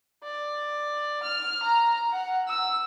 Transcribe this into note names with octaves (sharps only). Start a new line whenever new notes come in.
D5
F6
A#5
F#5
E6